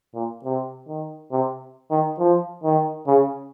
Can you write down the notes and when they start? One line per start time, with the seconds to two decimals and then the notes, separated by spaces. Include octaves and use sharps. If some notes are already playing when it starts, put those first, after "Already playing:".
0.15 A#2
0.44 C3
0.88 D#3
1.32 C3
1.91 D#3
2.19 F3
2.64 D#3
3.07 C#3